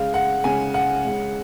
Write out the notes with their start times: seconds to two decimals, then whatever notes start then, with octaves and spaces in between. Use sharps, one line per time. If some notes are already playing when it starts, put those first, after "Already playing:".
Already playing: C#3 G#3 F5
0.14 F#5
0.44 C#3 G#3 G#5
0.74 F#5
1.04 C#3 G#3